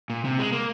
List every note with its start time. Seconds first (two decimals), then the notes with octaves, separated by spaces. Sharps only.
0.10 A#2
0.25 C3
0.39 G#3
0.52 A#3